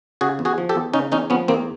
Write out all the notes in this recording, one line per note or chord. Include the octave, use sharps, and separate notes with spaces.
C#3 F#4 G#4
E2
F#4 G#4
F3
G4 A4
E2
C#3 C#4 D#4
E2 C#4 D#4
F3 B3 C#4
E2 A#3 C4